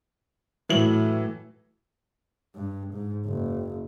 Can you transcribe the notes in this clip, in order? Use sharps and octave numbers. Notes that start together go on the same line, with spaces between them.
A2 E3 F#3 F#7
G2
G#2
F#1